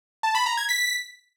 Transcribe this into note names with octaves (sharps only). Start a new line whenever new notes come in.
A5
B5
A#5
G#6
B6